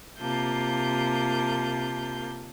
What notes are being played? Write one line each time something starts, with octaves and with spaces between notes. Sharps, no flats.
C3 A#3 F4 A5 G6